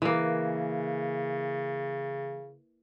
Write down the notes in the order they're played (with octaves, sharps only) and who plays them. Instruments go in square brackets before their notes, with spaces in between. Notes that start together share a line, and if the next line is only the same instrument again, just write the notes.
[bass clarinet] C#3 [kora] E3 A#3